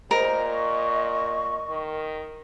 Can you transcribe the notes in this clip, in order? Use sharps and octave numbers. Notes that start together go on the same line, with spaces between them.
A#2 A#4 C5 D#5
C#6
D#3